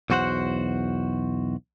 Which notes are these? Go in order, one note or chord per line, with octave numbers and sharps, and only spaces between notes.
B1 E2 F#4 C5 F#5